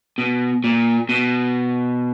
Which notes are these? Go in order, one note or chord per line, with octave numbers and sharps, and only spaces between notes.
B2
A#2
B2